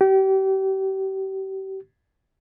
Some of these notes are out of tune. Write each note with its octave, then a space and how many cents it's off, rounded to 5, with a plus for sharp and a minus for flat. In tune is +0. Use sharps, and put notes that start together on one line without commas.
G4 -35